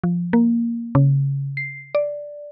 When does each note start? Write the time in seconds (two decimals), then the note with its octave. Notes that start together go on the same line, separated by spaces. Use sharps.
0.04 F3
0.33 A#3
0.95 C#3
1.57 C7
1.95 D5